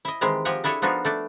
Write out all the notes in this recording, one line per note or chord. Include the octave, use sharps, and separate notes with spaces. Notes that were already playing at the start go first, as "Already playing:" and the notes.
E4 D#5
D#3 E3 G#3 C4 G4 C5
F3 G4 G#4 D#5 F#5
D4 E4 G#4 A4 C#5
F3 B3 D4 D#4 F4 F#4
A3 D4 D5